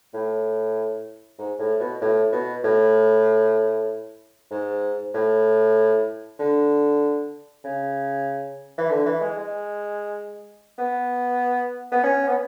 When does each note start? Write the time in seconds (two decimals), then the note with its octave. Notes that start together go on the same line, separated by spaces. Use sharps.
0.14 A2
1.38 G#2
1.59 A2
1.80 B2
2.01 A2
2.32 B2
2.64 A2
4.51 G#2
5.14 A2
6.39 D3
7.64 C#3
8.78 E3
8.90 D3
9.06 E3
9.21 G#3
9.37 G#3
10.78 B3
11.91 B3
12.03 C#4
12.28 B3